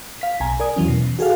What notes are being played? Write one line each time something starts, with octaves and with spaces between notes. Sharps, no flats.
F5 B6
B1 G#5 A#5
A#4 D5 G#5 D#6
E2 E3 F#3 C#4
B2
F#4 G#4 A4 F5